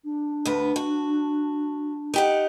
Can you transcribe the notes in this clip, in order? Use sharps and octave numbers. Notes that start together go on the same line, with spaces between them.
D4
D2 B3
F#4
D#4 G4 F#5